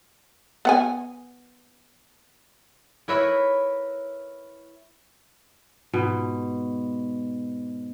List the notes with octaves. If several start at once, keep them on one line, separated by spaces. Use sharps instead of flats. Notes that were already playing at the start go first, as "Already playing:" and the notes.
B3 F#5 G#5
E4 A#4 B4 C#5 E5
G#2 B2